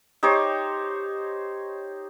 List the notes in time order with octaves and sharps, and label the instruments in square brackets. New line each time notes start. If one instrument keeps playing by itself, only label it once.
[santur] D#4 G4 C5 C#5